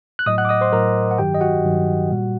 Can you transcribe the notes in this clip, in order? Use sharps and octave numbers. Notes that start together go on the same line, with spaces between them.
F#6
A2 F#3 D#5 D#6
F#5 F#6
D6
D#5 D#6
C5 C6
A2 F#3 A#4 A#5
F#5
G2 D#3 F#3 G4 G5
D#5
F#4 F#5
G2 D#3 F#3
A#2 G3